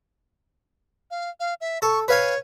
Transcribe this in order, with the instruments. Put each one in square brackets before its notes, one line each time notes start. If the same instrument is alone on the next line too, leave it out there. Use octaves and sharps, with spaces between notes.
[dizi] F5
F5
E5
[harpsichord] A4 [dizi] C#6
[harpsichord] B4 F5 G#5 [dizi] C#5